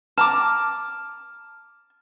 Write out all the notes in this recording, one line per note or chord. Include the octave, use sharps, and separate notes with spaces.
A5 A#5 D6 F6